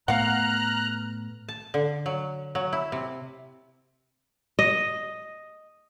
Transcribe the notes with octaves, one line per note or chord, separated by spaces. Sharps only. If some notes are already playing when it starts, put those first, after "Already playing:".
A2 A3 B3 F5 F#5 A#5 F6 F#6
A5
D3
F#3
F#3
E4
C3
D#5